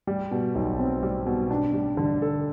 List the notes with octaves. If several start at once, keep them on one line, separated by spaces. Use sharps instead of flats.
G3
B2
B1
C4
G3
B2
D4
G3
D3
A4